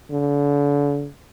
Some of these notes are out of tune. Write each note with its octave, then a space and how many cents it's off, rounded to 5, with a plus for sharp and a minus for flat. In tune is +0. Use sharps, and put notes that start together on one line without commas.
D3 -35